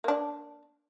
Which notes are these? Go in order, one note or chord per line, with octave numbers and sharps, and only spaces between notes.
A#3 D4